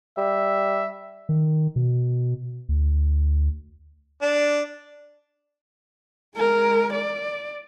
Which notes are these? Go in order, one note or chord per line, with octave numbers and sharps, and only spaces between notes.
G3 E5
D#3
B2
D2
D4
G#3 A#4
D5